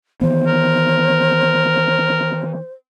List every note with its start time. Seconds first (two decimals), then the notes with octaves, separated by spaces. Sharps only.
0.21 D#3 E3 B3 C5
0.47 A#4